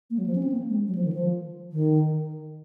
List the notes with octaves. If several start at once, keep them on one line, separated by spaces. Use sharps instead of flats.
A#3
F#3
F3
C#4
C4
A#3
G#3
F#3
F3
D#3
F3
D#3